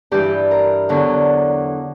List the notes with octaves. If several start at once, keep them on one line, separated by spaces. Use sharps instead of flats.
G2 E3 G4
A#4
E2 D3 F#3